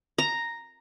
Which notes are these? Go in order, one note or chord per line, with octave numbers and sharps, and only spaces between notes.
A#5